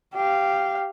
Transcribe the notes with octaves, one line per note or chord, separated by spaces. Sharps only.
G4 F5